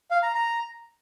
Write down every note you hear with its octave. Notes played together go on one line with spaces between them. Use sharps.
F5
A#5
A#5